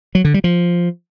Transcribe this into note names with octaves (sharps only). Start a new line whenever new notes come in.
F#3
D3
G3
F3